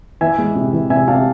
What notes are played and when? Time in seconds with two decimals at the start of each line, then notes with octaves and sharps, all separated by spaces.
0.21 E3 E5 G#5
0.38 G#3
0.55 C3
0.73 E3
0.90 C3 E5 G#5
1.08 C3 F5 A5